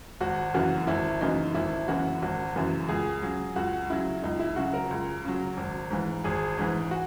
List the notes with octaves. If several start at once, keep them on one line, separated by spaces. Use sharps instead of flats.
G#1 F#4
F#2 C#3 E3 A#3 F#4
G#1 E4
F#2 C#3 E3 A#3 D#4
G#1 E4
F#2 C#3 E3 A#3 F#4
G#1 F#4
F#2 C#3 E3 A#3
C#2 G#4
C#3 F#3
C#2 F#4
C#3 F#3 E4
C#2 D#4
E4
C#3 F#3 F#4
A#4
C#2
C#3 F#3
G#1
G#2 E3
G#1 G#4
G#2 E3
F#4